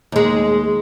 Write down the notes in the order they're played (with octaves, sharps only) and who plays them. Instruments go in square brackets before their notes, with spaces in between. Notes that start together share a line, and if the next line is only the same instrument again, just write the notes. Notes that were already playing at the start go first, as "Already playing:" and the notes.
[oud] D#2 G#3